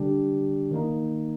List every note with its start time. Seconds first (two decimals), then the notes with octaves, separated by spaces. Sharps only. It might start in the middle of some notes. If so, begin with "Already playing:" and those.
Already playing: D3 G3 D4 G4
0.71 D#3 A#3 D#4